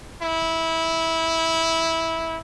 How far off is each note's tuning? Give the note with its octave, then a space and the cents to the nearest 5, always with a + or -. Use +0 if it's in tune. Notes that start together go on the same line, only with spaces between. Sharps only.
E4 -15